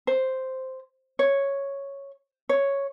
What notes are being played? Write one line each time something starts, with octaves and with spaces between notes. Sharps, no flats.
C5
C#5
C#5